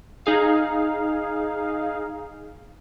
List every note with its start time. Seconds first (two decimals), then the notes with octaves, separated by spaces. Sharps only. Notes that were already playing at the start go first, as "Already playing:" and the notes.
0.26 D#4 G#4 F5